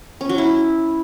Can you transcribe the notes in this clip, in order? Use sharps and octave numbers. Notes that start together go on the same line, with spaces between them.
C#4
F#3
E4